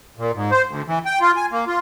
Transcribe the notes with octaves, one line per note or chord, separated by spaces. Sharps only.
A#2
G#2
C5
D2
E3
G5
F4
G#5
A#3
F4